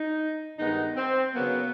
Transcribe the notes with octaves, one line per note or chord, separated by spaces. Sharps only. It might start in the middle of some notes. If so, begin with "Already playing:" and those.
Already playing: D#4
G2 D#3 G#3 B3 D#4
C4
C#3 F#3 A#3 B3